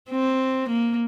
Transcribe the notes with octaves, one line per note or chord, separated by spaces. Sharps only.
C4
A#3